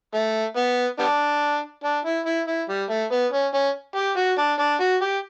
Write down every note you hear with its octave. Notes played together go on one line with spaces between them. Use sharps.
A3
B3
G3 B3 D4
D4
E4
E4
E4
G3
A3
B3
C#4
C#4
G4
F#4
D4
D4
F#4
G4